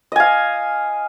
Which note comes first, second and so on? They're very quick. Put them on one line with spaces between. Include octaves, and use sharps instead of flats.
D#5 G#5 F5